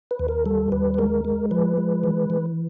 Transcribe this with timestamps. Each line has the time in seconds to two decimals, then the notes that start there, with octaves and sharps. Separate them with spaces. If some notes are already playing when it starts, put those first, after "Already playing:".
0.11 B4
0.19 D#2
0.28 A#4
0.46 G3 A4
0.72 D#2 B4
0.94 B4
0.98 G#3 A#4
1.25 G#3
1.51 F3 B4
1.78 G#3
2.04 E3
2.30 E3